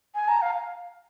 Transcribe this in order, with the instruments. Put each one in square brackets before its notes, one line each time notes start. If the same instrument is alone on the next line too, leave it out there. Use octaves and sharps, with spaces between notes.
[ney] G#5
A#5
F5